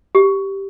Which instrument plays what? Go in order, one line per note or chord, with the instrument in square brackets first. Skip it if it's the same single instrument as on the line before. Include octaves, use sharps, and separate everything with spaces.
[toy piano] G4